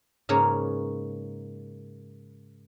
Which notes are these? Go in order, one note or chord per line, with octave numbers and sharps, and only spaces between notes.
G#2 C#3 A#3 B4 C#5 A#5